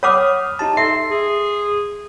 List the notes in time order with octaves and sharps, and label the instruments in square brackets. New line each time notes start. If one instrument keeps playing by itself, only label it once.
[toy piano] C#5 F#5 D6 [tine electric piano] B5 D#6 F6
[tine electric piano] D#4 G4 A5
[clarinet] A4 [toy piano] E5 [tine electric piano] C6 C7
[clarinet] G#4